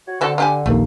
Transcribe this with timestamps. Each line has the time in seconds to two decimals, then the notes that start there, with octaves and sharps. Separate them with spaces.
0.07 F#4 C#5
0.21 D3 C4 F#4 A4
0.38 D4 G4 G#5
0.66 A#1 D#2 A3 A#3